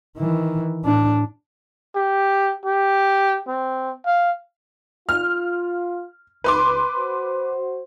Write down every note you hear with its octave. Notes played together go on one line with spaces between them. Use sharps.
D#3 E3
A2 D4
G4
G4
C4
F5
F4 F6
C#2 B4 C6 D6
F#4 C5